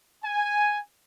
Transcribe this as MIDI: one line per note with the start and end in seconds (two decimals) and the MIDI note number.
0.23 0.77 80